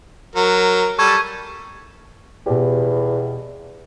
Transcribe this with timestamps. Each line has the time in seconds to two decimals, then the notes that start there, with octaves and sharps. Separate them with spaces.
0.36 F#3 A#4
0.99 G3 A4 C#6 G#6
2.46 E2 B2 G4